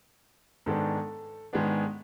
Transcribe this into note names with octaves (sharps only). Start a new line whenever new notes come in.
G#2 D#3 G#3 B3 D4 A4
G#2 D#3 G#3 B3 D4